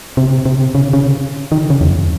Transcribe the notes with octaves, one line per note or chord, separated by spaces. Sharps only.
C3
C3
C#3
C#3
D#3
C#3
E2
F#2